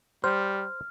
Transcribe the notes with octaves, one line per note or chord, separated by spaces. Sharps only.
G3 C5 F6